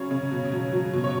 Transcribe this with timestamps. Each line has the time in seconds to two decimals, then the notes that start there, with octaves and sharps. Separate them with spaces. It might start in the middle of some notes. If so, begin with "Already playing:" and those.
Already playing: C#3 F#3 C#5
0.11 C#3
0.31 B2
0.52 F#3
0.72 F#3
0.93 B2
1.04 C#5